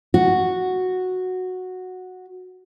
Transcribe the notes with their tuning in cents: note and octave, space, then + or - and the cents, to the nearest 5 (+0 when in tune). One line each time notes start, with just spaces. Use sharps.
F#4 -5